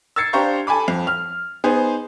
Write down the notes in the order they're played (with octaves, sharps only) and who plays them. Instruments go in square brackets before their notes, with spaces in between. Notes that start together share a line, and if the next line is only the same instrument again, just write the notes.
[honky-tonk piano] E6 G#6 A6 C7 C#7
D4 G4 C5 F5 A#5 C#6
A4 G#5 A5 B5 D6
F2
F6
B3 D#4 G#4 C5